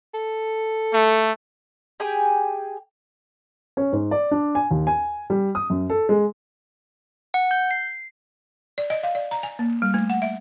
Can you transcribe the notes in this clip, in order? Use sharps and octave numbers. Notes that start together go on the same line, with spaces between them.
A4
A3
G4 G#4 G5 G#5
C#4
G#2
D5
D4
G#5
D#2
G#5
G3
D#6
F#2
A4
G#3
F#5
G6
C7
D5
D#5
F5
D5
A#5
G#5
A#3
G3
A3
F#5
E5